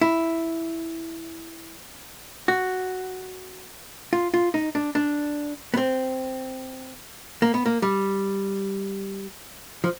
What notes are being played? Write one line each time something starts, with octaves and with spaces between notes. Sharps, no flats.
E4
F#4
F4
F4
D#4
D4
D4
B3
C4
A#3
B3
A#3
G3
F3